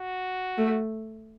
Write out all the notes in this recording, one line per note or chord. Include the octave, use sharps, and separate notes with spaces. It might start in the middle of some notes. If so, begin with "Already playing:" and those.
Already playing: F#4
A3